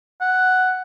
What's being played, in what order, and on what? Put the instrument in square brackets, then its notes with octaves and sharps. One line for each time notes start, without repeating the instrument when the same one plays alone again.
[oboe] F#5